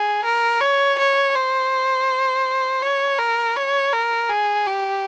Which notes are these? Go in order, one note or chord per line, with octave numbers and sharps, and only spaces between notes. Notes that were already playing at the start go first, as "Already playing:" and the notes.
Already playing: G#4
A#4
C#5
C#5
C5
C#5
A#4
C#5
A#4
G#4
G4